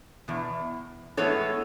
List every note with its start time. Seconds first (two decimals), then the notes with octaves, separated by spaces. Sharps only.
0.28 E2 B2
1.17 A2 E3 G#3 B3 A4 C#5